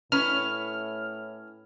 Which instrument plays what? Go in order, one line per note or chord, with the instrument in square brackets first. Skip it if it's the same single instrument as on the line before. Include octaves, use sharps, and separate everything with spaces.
[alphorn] A2 [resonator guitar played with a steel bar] C#4 B4 [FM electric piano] F6